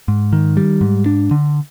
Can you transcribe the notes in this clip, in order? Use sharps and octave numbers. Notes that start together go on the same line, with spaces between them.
G#2
D#3
G3
G#2
D4
D3